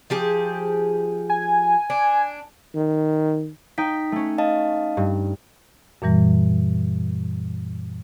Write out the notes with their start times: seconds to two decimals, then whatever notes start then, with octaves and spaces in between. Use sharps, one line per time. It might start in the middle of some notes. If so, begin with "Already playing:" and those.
0.10 F3 G4 G#4
1.30 G#5
1.90 D4
2.75 D#3
3.78 D#4 G5 B6
4.12 A3 C#4
4.38 D#5 F5 A5
4.97 G2
6.02 F#2 A#2 E3 G3